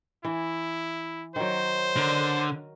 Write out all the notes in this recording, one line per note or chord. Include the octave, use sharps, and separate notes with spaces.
E3 E4
D#3 F#3 C5
D3 A#4